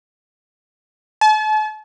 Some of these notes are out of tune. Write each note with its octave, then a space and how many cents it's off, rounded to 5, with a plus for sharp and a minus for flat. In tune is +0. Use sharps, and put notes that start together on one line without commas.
A5 -40